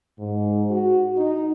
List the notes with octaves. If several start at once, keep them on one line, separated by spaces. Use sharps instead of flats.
G#2
F#4
D#4